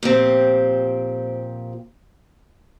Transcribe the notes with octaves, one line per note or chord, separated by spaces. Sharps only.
A#2 F3 C4 G4